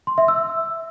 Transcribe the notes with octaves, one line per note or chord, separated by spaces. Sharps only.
C6
E5
E6